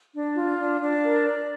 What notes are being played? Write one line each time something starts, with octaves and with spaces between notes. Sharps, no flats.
D4
F4
D4
D4
A#4
D5